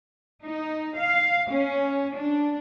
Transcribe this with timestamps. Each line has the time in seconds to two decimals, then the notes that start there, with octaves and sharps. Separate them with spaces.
0.42 D#4
0.97 F5
1.50 C#4
2.14 D4